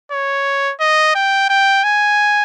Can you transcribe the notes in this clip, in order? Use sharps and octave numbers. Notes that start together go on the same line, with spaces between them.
C#5
D#5
G5
G5
G#5